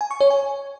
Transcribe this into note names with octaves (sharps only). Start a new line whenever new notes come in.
G#5
C#6
C#5
G#5